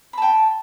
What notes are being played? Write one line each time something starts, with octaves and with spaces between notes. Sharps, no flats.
G5 A5 B5